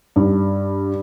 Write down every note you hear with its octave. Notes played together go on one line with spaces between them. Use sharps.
G2